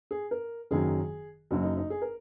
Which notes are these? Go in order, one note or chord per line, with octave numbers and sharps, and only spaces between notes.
G#4
A#4
F#1 F#2 D#3 F#3 G#4
F#1 F#2 F#3 F#4
D#4
D#4
G#4
A#4